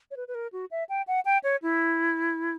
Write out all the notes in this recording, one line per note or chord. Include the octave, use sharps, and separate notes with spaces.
C#5
B4
B4
A#4
F#4
E5
G5
F#5
G5
C#5
E4